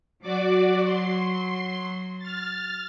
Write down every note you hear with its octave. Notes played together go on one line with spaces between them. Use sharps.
F#3 F#4 D5 D6
C6
F6 A6